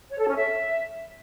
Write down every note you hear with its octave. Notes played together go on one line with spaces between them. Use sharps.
C#5
A4
C#4
E5